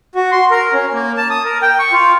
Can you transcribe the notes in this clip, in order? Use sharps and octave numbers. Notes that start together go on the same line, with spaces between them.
F#4
C6
A#4
C#4
A#3
A5
D#6
A#4
G5
C#6
F4